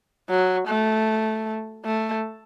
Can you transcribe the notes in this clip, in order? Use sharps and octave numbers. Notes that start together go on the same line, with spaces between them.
F#3
A3
A3